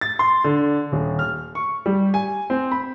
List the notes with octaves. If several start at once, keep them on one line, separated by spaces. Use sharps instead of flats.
A6
C6
D3
D#1
F6
C#6
G3
G#5
C4
B5